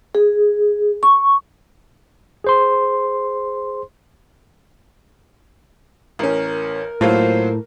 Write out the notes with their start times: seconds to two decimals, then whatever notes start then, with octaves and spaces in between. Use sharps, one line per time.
0.15 G#4
1.03 C#6
2.44 G#4 C5 C6
6.19 A1 C#4 A#4
7.01 A2 F#3 A#3 F4 C5